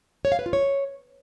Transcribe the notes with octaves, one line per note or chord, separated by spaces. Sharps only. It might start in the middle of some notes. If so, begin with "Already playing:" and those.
C#5
F5
B4
F4
C#5